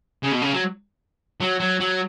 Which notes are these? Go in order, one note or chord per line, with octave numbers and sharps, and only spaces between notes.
C#3
B2
C#3
F#3
F#3
F#3
F#3